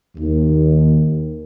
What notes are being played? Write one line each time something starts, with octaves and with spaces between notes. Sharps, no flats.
D#2